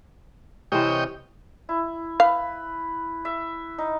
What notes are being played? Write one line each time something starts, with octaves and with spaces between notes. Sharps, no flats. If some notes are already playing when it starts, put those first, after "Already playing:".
C3 E3 C5 C#5 D#5 G5
E4
B4 F5
E5
D#4